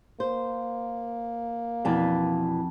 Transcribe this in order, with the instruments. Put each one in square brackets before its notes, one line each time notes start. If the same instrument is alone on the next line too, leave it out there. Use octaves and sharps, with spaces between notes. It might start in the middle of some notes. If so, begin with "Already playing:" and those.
[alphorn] A#3 [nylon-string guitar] C5
[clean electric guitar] F2 [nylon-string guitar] B2 E3 D5